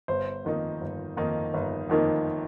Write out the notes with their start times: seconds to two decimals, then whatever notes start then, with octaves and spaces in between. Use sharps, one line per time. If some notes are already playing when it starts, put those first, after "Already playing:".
0.08 G1 C5
0.44 F2 D#3 A#3 D#4
0.81 G1
1.17 F2 D#3 A#3 D#4
1.54 G1
1.90 F2 D#3 A#3 D#4